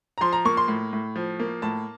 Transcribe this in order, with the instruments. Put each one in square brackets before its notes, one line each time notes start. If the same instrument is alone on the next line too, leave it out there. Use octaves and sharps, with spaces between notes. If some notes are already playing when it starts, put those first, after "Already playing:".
[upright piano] A#5
F3 C6
A#5
A#3 C#6
C6
A2
A2
F3
A#3
A2 A5